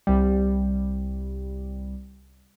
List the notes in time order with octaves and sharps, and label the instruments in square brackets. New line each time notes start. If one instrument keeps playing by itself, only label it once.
[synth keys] C2 G3